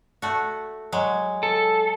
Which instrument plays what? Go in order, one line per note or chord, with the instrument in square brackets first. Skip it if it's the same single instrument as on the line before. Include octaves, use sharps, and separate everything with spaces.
[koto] A3 F#4
F#3 G#3
[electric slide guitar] A4